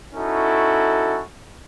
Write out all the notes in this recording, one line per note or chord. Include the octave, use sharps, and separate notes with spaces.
C#4 D#4 E4 F#4 A4